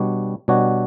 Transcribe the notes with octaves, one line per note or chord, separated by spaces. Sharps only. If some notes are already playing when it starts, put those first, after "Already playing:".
Already playing: B2 G3 D4 F#4 C#5
B2 G3 D4 F#4 C#5